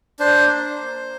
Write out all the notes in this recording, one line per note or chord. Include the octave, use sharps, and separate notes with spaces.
D4 C5
A#3